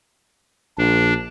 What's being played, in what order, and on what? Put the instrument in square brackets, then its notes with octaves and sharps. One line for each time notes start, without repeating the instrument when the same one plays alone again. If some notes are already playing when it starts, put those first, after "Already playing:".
[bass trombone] A#1 [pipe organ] D4